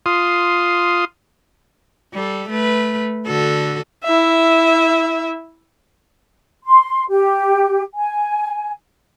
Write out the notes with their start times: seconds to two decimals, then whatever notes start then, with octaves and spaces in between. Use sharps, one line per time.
0.06 F4 C6 D#6
2.13 G3 A4
2.49 A3 B4
3.27 D3 F#4 A4
4.04 E4 E5
6.65 C6
7.09 G4
7.95 G#5